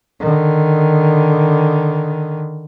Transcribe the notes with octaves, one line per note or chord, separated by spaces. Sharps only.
D3 D#3